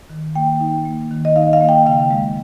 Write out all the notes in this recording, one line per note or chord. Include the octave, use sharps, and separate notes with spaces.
D#3
A#3 G5
D#4
A#3
D#3
D#5
D#4 F5
F5
A#3
G5
C#3 F5
G#3